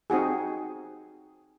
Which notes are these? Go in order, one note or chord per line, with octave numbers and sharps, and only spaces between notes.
C4 D#4 F#4 G#4